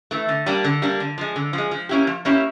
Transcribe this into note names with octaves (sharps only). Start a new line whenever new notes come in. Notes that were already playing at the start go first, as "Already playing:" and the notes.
E3 A3
D3
G3 A#3 D4
D3
G3 A#3 D4
D3
F3 G#3
D3
F3 G#3
F3
A#3 C#4 E4 G4
F3
A#3 C#4 E4 G4